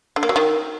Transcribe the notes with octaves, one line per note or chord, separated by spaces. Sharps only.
D3
A#3
F#3
D#3